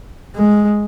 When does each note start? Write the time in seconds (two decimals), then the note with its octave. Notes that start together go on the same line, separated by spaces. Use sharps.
0.36 G#3